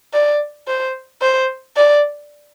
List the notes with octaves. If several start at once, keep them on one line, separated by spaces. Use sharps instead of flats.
D5
C5
C5
D5